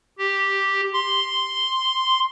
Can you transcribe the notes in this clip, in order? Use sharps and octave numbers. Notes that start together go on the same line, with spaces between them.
G4
C6